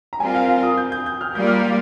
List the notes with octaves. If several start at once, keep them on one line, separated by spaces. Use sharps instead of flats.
A#5
G3 C4 F4 A#4 G#5
F5
F5
D#6
G6
G6
G6
F6
G3 A#3 F4 A#4 D5 G6
F6
G6